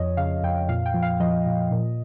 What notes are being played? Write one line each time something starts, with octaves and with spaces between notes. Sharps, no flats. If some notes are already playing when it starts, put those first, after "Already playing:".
Already playing: F2 F3 C#5 D#5
C#3 F5
F2 G5
A#2 F5
G5
F3
F5
F3 D#5
A#2
A#2